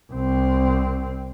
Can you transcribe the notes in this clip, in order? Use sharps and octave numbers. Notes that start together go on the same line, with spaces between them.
C2 C4